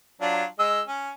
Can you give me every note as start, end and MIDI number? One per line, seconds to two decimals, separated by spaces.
0.21 0.44 54
0.21 0.44 62
0.21 0.44 65
0.59 0.81 56
0.59 0.81 75
0.59 0.81 88
0.87 1.10 61